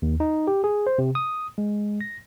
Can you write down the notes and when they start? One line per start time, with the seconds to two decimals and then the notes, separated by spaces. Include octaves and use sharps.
0.02 D#2
0.20 D#4
0.47 G4
0.64 G#4
0.87 C5
0.98 C3
1.15 D#6
1.58 G#3
2.01 A#6